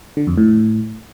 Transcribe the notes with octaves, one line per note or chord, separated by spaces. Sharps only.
D3
F2
A2